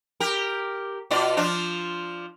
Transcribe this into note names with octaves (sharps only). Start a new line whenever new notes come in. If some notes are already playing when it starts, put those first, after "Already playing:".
G4 A#4
B2 F4 D5
F3 D4 F4